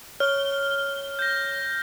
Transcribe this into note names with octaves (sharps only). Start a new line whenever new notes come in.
C#5 F6 G7
G6 A#6